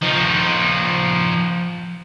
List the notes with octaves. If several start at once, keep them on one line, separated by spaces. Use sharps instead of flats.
F3 D#4